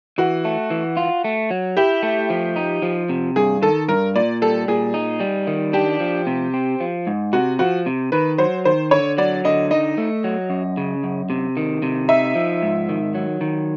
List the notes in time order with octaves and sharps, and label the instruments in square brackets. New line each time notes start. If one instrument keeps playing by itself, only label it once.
[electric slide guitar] E3 [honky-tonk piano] F#4
[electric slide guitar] A3
E3
F4
A3
F#3
[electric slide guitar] E4 [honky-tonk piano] G4
[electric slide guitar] A3
F3
D#4
F3
C3
[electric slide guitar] G2 [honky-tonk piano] G#4
[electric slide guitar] D#3 [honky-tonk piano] A4
[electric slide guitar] G2 [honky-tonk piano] A#4
[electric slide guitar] A#2 [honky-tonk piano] D5
[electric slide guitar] G3 [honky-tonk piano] A4
[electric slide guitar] A#2 [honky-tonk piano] G#4
[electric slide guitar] D#4
G3
D#3
[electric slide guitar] D4 [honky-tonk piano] G4
[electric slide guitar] F3
C3
C4
F3
G#2
[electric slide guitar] C3 [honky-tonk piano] F#4
[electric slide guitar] F3 [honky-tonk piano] F#4
[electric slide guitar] C3
[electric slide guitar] D#3 [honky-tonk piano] B4
[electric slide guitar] F#3 [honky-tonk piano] C5
[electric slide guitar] D#3 [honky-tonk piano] C5
[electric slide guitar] D3 [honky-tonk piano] C#5
[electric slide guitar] F#3 [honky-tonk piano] D5
[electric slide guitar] D3 [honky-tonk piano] D#5
[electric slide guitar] D#4 [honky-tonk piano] D#5
[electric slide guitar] A3
F#3
F#2
C#3
F#2
C3
D#3
C3
[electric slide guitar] D#4 [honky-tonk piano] E5
[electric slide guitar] F3
G#2
D#3
F#3
D#3